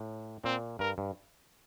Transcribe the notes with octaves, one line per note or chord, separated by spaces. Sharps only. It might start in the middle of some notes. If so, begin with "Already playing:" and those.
Already playing: A2
A#2 C4
G2 A#4
G2